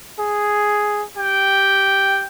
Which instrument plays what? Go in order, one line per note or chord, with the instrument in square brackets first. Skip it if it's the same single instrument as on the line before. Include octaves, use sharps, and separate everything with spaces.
[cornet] G#4
[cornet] G4 [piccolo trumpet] G5